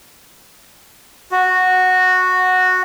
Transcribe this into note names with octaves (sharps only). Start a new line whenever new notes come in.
F#4